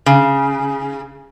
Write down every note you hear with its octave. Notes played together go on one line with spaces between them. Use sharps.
C#3